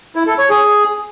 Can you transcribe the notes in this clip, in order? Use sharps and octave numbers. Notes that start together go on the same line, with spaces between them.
E4
A4
C#5
G#4